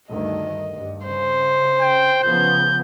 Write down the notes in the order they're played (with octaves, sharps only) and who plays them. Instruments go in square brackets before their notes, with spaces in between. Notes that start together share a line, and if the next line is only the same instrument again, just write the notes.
[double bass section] D2 G2 D#3 [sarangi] D#5
[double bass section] G2
[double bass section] C#3 [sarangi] C5
[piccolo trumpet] G5
[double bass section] C#3 F3 B3 [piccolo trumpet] G6